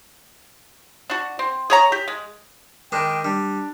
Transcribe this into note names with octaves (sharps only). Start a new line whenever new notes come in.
D4 F#4
C4
G#4 C#5 A#5
G4
G#3
D#3 G#3 D4 G5
G3 D4